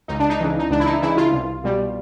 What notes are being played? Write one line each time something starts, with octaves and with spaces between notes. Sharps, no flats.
C#2 D#4
D4
D#4
C#3 E3
D#4
C#2 D4
E4
D#4
C#3 E3 E4
F4
C2
B2 G3